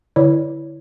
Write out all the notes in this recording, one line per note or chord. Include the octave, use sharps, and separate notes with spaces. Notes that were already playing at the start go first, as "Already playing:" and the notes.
D3 E4 C#5 D5